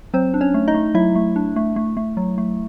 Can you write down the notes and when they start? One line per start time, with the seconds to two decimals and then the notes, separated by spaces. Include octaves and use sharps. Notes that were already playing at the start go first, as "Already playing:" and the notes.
0.14 F#3 C4 C5
0.34 D4
0.41 C#4 C#5
0.54 A3
0.68 D#4 D#5
0.74 A3
0.94 F#3 E4 E5
1.15 A3
1.36 D4
1.56 A3
1.76 A3
1.97 A3
2.17 F#3
2.38 A3